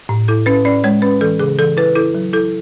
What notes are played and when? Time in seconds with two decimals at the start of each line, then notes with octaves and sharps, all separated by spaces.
0.09 A2
0.28 E4 A4
0.46 C#4 B4
0.65 C#4 D5
0.84 G#3 C#5
1.02 C#4 B4
1.21 E3 A4
1.40 C#3 G#4
1.58 E3 A4
1.77 E4 B4
1.95 E4 A4
2.15 F#3
2.33 E4 A4